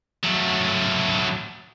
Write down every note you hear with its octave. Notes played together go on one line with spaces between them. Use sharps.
F#3 A3